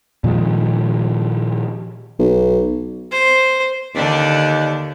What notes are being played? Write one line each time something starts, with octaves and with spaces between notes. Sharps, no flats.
A#2 D#3 F3 G#3
B1
C5
D#2 D3 D4 D5